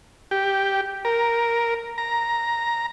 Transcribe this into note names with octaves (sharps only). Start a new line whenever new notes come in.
G4
A#4
A#5